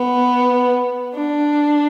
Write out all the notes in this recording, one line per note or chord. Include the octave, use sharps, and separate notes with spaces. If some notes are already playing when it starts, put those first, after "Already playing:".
Already playing: B3
D4